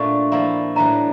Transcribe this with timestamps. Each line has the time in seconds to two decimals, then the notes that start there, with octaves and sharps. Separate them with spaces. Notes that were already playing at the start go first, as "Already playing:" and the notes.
Already playing: A#2 A3 D4 F4 C#6
0.32 F3 A#3 E4
0.76 A2 E3 G3 D4 A#5